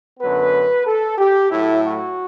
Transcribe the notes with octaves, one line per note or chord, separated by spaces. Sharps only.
F#2 D3 F#3 B3 B4
A4
G4
A2 F#3 A3 E4
F#4